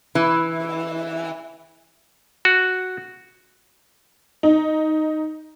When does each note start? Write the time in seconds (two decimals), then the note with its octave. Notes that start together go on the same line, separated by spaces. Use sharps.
0.15 E3
2.45 F#4
4.43 D#4